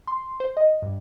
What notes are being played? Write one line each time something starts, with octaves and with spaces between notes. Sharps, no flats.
C6
C5
D#5
G2